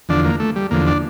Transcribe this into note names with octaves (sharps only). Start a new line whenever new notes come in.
E2 D3 F3 D4
A#3
A3
G3
E2 D3 F3 A#3
D4